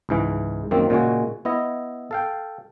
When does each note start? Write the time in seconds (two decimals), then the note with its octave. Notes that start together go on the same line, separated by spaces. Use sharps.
0.09 C#2 G#2 E3
0.71 F#2 D#3 A#3 C4
0.90 A#2 C#3 G#3 F#4
1.45 B3 E4 D#5
2.11 A4 F5 G5